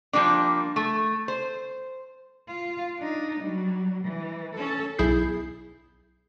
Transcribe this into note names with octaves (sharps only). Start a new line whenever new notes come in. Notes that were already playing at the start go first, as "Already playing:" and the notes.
F3 G3 A#3 D4
A3
C5
F4
D4 D#4
F#3 G3
E3
C#4 A4
B1 E4 G#4 G6 C7